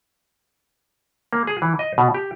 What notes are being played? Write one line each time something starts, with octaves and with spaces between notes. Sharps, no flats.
A#3
G#4
E3
D#5
B2
G4